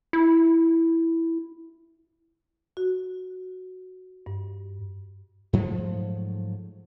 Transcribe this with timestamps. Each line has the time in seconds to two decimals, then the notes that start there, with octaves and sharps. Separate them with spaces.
0.13 E4
2.77 F#4
4.26 G2
5.53 G#2 F3 F#3 A3